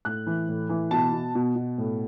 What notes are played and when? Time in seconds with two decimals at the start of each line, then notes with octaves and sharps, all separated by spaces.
0.05 A2 F#6
0.27 E3
0.48 A2
0.69 E3
0.91 B2 A5
1.12 B2
1.35 B2
1.55 B2
1.78 A2